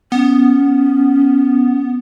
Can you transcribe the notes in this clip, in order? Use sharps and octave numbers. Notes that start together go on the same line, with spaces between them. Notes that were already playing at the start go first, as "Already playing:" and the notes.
B3 C#4